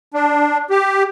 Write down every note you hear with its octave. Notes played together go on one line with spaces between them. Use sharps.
D4
G4